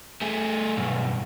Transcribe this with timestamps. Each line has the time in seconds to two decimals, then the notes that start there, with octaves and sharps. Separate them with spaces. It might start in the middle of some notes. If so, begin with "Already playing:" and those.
0.22 A3 G#4
0.77 B1 G2